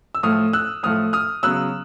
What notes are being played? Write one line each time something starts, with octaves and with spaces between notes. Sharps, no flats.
E6
A2 F3 A3 D#6 F6
E6 F#6
A2 F3 A3 D#6 F6
D#6 F6
C#3 F#3 B3 E6 F#6